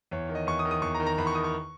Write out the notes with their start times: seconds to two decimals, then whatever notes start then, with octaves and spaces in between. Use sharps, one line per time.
0.11 E2 C#5
0.29 D#3
0.35 D#5
0.47 E2 C#6
0.59 D#6
0.65 D#3
0.71 D#6
0.82 E2 C#6
0.95 A#5
1.00 D#3
1.06 A#5
1.18 E2 B5
1.27 C#6
1.35 D#3 D#6
1.44 C#6